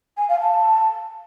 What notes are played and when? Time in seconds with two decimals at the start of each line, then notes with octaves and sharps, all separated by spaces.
0.17 G#5
0.29 F5
0.41 A5